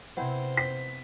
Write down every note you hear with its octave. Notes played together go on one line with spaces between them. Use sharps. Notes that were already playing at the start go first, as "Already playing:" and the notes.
C3 B3 C4 E4 C5
B6